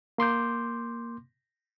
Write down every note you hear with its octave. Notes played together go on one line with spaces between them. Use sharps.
A#3 C6 D6 G6